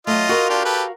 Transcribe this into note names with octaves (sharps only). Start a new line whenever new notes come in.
F#3 A3 F4 D#5
F#4 A#4 F5
D4 F4 G4
G4 A4 B4